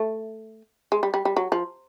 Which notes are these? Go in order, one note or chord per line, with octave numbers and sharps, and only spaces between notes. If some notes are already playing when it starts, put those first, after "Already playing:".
Already playing: A3
G#3
G3
G3
G3
F#3
F3